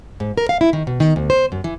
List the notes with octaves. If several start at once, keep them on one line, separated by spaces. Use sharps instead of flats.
G#2
A#4
F5
E4
D#3
B2
D#3
D2
C5
F#2
E3